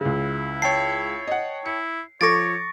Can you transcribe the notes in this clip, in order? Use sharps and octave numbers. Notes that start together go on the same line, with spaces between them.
C#2 C#3 E4
C#5 G5 A5 C7
D#5 F#5
E4 C#7
F3 A4 C#5 C#6 D6 A6 A#6 D7